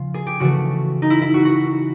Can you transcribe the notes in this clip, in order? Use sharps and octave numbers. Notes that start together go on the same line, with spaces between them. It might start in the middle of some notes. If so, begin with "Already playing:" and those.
Already playing: C#3 F3 F4
G#4
G4
C#3 E3 A3 F#4
D#4
E4
E4
F#4
F#4